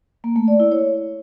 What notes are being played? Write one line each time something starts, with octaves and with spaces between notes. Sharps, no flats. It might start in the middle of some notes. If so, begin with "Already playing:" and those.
A#3
A3
D5
E4
C#5